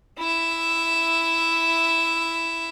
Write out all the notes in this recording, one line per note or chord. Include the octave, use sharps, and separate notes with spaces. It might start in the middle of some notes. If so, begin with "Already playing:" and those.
E4 E5